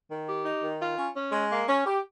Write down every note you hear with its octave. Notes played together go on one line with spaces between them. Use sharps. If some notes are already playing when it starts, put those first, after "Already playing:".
D#3
G4
D#4
D#3
F4
C#4
C#4
G#3
A#3
C#4
G4